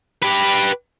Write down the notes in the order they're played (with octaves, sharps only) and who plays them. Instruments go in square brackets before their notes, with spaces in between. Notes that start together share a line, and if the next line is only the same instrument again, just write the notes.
[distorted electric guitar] G4 B4